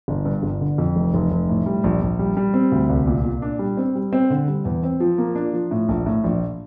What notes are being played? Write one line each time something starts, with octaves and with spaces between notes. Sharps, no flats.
G1
G2
G1
D3
F2
F1
F1
F1
A2
G3
A#1
A#1
G3
G3
C4
D2
C2
A#2
A#2
D4
G3
C4
G3
C4
D3
G3
E2
C4
F3
A#3
D4
F3
A2
A#1
A2
A#1